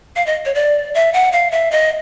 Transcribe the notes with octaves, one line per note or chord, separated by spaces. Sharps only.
F5
D#5
C#5
D5
E5
F#5
F5
E5
D#5